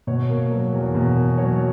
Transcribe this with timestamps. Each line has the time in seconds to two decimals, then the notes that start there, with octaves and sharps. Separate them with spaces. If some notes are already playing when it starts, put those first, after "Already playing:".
0.07 B2 C#5
0.29 A#3
0.51 F#3
0.73 E2
0.95 B2
1.17 A#3
1.38 F#3 C#5